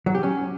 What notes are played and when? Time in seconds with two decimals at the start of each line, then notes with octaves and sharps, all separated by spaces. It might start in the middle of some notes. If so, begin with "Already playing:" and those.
0.06 F#3
0.15 G4
0.23 C#4